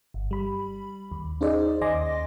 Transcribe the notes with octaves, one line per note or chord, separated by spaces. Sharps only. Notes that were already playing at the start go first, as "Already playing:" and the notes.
G1
G3 B5
D#2
C#4 D#4 G#4 C5 D5 D#5
D#2 D#5 G#5 C6 D6 A#6